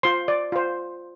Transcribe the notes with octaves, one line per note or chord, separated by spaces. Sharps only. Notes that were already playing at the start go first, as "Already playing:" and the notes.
F4 C5 C6
D5
F4 C5